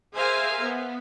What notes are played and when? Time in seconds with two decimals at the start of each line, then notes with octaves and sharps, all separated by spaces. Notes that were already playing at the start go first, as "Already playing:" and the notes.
0.15 G#4 A#4 C5 E5 F5 G#5
0.62 B3